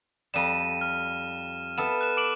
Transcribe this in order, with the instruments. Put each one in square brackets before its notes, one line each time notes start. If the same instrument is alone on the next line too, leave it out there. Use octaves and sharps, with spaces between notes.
[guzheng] F2 G3 [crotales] D#7 E7
[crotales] F6
[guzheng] B3 A4 E5 [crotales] E7
[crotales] F#6 E7
D6 D7 F#7